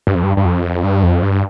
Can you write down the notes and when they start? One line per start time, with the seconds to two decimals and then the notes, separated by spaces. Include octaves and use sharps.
0.07 G2
0.15 F2
0.23 G2
0.37 G2
0.45 F2
0.84 G2
1.03 F2
1.23 G2